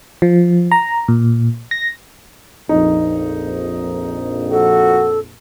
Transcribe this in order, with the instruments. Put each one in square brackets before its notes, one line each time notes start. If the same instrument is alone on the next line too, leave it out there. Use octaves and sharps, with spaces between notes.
[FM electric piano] F3
A#5
A#2
A#6
[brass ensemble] A#1 F2 [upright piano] D#4
[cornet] F#4 [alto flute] A4